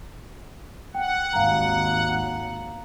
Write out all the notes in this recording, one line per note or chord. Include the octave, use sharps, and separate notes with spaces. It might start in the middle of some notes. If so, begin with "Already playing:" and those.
F#5 G5
G#1 D#2 F5 A#5